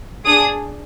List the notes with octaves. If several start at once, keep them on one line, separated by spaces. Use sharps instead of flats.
D4 G#4 D#6